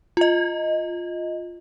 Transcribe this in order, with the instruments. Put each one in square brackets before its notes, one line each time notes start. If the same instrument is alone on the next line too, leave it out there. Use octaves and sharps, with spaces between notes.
[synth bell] F4 D#5